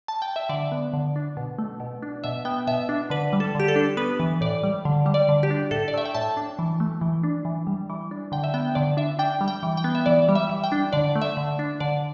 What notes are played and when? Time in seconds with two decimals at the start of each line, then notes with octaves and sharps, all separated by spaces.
0.08 A5
0.22 G5
0.36 E5
0.49 D3 D5
0.72 B3
0.93 D3
1.16 D4
1.37 B2
1.59 A3
1.80 B2
2.03 D4
2.24 B2 E5
2.45 B3 G5
2.67 B2 E5
2.89 D4
3.10 D3 B4
3.33 G3
3.40 A4
3.55 D3 G4
3.68 A4
3.76 D4
3.97 B3 B4
4.20 E3
4.41 A2 D5
4.63 G3
4.85 D3
5.06 G3
5.14 D5
5.29 D3
5.43 G4
5.50 D4
5.71 A2 A4
5.88 D5
5.94 A3 E5
6.05 G5
6.15 A2 A5
6.37 D4
6.59 E3
6.80 A3
7.01 E3
7.23 D4
7.45 E3
7.67 G3
7.90 E3
8.11 D4
8.32 D3 G5
8.44 E5
8.54 B3 G5
8.75 D3 D5
8.97 D4 E5
9.19 D4 G5
9.41 G3
9.48 G5
9.63 E3
9.77 G5
9.84 B3
9.95 E5
10.06 E3 D5
10.29 G3
10.35 E5
10.49 E3
10.64 G5
10.72 D4
10.93 D3 D5
11.16 A3
11.22 E5
11.37 D3
11.59 D4
11.80 D3 D5